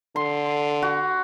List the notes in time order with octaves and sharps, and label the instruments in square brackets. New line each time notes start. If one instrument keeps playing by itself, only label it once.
[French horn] D3 [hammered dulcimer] C6
[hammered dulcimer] F#4